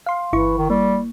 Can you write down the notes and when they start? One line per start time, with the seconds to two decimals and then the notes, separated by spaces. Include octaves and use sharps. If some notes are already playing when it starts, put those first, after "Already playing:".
0.06 F5 C6
0.33 G1 E3 E4 C#6
0.58 D#3
0.70 G3 A#3